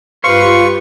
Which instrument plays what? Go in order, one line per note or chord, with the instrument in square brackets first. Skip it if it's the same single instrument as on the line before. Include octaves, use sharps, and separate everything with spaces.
[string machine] G2 F4 G4 [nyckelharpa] B4 [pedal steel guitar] C5 F5 C6 [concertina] C#6